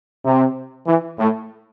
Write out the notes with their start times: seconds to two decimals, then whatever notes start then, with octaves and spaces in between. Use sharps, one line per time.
0.25 C3
0.87 E3
1.18 A2